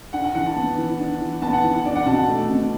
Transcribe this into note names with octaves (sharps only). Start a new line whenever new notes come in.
D4 F#5
F#5
E3 F#5
A5
B3
E3
D4
E3
B3 A5
F#5
E3
F#5
D4 D5
F#5
B2 A5
F#5
A3
B2